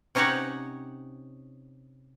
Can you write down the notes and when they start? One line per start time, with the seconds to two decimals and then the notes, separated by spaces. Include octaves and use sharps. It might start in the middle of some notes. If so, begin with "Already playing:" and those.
0.15 C3 C#4 D#4 G4 C#5 F#5